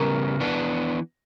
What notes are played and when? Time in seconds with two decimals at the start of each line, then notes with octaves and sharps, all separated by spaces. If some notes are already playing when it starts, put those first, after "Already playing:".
Already playing: C#3 G3 B3 A#4
0.40 E3 B3 D4